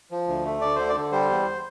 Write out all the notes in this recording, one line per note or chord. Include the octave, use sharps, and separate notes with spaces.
F3
D2
A3
D2 D5
D3 C5
D5
D3
G3 C5
E2